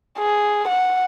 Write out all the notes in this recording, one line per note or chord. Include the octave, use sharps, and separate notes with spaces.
G#4
F#5